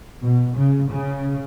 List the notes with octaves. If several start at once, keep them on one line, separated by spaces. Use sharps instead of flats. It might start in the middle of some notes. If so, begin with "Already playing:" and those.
B2
C#3
C#3